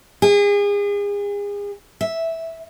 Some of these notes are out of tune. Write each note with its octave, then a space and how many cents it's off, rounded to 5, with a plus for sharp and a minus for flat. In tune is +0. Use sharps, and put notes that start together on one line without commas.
G#4 -35
E5 -5